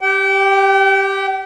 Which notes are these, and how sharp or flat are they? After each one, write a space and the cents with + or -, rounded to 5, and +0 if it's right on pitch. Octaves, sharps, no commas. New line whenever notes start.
G4 +0 G5 -40